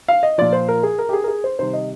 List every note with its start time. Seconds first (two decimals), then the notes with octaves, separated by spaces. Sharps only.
0.08 F5
0.23 D#5
0.38 A#2 F3 D5
0.53 C5
0.68 A#4
0.83 G#4
0.98 A#4
1.09 G4
1.13 G#4
1.24 A#4
1.28 G#4
1.44 C5
1.59 C3 D#3 G3 C5
1.73 D#5